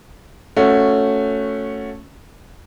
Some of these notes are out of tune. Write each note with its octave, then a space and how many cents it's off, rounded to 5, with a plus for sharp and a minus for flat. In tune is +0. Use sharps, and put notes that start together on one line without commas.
A3 +5 C#4 +0 F#4 -10